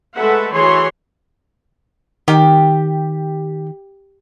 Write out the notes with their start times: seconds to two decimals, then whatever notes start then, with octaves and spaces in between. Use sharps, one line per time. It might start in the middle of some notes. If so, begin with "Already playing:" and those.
0.16 G#3 A3 A4 B4 E5 F#5
0.53 E3 F#4 G#4 C#5 C6
2.28 D#3 G4